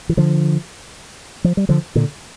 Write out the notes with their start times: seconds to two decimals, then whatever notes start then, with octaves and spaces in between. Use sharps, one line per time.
0.09 E3
0.17 D3 F3
1.44 F3
1.57 G3
1.69 D3 F3
1.95 A#2 D3